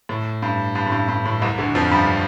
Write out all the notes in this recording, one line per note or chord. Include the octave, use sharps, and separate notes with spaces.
A2
G2
G2
A2
G2
G2
A2
C2 C3
D2 D3
F2 F3
G2 G3